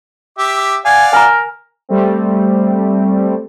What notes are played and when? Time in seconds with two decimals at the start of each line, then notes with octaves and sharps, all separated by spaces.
0.38 G4 E5 D6
0.85 D5 F5 F#5 G#5
1.13 A#4 G#5 A#5
1.89 G3 A3 C4